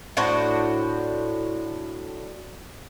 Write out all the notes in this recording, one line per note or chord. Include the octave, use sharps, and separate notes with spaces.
A2 D4 F#4 C5